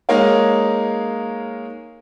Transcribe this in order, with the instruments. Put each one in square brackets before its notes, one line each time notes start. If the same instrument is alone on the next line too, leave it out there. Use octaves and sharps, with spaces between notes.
[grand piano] G#3 A#3 D#4 A#4 C#5 F5